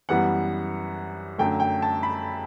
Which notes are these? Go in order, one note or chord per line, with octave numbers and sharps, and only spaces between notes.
F#2 E3 G3 B3 F#5
F#2 D3 F#3 A3 G5
G5
A5
B5